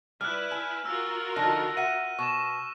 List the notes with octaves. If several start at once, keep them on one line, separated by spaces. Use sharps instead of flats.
G3 E4 B4 F6 F#6
G#5
F4 F#4 A#4 E6
D3 F3 D#4 A#6
E5 F#5 D#7
B2 C#6 E7